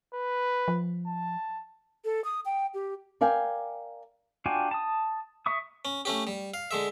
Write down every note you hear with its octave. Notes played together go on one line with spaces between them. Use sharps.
B4
F3
A5
A4
D#6
G5
G4
A#4 D5 F5 G5 G#5
D4 F4 F#4 G5 G#5
A5 D#6
E5 C#6 D#6
C#4
A3 C#4 G4
G3
F5
D3 G#3 E5